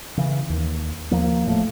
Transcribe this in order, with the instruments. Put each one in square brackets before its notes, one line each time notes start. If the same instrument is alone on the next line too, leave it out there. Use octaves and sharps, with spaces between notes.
[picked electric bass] C#3 E3
D#2
D#2 F3 A#3
D1 A2 F3 A3